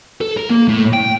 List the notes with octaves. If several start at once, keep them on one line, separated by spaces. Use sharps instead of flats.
A4
A#4
A#3
A2
G5